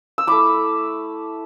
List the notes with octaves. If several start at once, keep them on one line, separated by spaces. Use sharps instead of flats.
E6
A3 E4 B5 D6